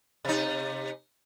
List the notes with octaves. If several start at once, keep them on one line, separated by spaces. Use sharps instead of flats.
C3 D#4